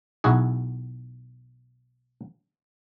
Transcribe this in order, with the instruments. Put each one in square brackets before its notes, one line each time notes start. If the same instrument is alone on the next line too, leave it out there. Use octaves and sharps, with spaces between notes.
[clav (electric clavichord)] B1 E4 F#4 G#4